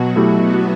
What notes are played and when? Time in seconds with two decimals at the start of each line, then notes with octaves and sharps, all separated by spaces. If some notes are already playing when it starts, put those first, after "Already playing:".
Already playing: B2 F#3 F#4
0.16 A3 E4 G4
0.39 B2 B3